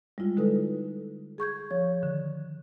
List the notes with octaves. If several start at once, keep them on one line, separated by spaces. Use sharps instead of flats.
G3 G#3 E4 F4
D3 G#3 D#4 A4 B4
G#4 C#6 G6 G#6
F3 C#5
D3 D#3